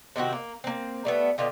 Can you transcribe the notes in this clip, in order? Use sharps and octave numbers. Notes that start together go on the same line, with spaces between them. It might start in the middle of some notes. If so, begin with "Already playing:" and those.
C3 D#3 C4 F#4
A#3
A#3 C4
G3 A3 B3
B2 D3 F4 G4